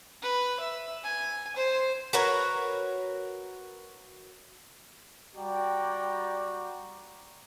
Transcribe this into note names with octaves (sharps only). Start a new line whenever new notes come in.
B4
E5
G#5
C5
F#4 A#4 B4 C#5
G3 F#4 D5 G5 A#5